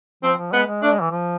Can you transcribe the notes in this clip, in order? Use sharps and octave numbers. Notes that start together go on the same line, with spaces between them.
F3 C4
F3
G#3 B3
G#3
A3 D4
G#3
E3
F3